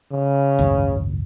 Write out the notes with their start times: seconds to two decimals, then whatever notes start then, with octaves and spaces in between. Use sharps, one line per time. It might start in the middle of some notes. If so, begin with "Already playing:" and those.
0.12 C#3
0.59 G#1 C#2 F#2